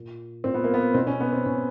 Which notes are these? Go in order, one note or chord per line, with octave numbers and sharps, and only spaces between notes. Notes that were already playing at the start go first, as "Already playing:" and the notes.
Already playing: A#2
A#2 C4
B3
A#3
B3
B2 C4
C#4
B3
C4
B2 C#4